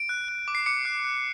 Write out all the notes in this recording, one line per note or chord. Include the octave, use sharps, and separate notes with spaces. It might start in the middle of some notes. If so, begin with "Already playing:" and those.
Already playing: D7
F#6
F#6
D6
C7
D6 C#7
F#6
F#6